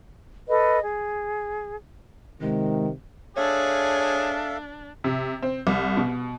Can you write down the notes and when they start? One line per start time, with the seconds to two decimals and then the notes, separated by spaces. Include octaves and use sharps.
0.49 A4 B4 D#5
0.82 G#4
2.41 C3 D#3 G#3
3.37 D4 G#4 A4 C#5 E5 F5
5.04 C3
5.42 C4
5.67 C2
5.97 B2